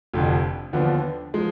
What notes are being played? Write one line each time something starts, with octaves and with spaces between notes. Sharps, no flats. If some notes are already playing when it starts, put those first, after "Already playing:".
F1 F2 D3
D#2 D3 F3 B3 D4
F3 G#3